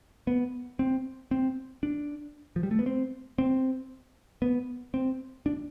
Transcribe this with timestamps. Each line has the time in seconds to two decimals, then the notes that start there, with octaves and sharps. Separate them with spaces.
0.27 B3
0.79 C4
1.31 C4
1.83 D4
2.56 F3
2.63 G3
2.71 A3
2.79 B3
2.86 C4
3.38 C4
4.42 B3
4.94 C4
5.46 D4